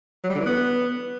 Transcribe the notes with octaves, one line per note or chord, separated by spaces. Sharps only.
F#3
G3
D3
E3
B3